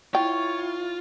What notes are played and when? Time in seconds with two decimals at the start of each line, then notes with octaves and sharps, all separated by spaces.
0.15 E4 F4 C#5 G5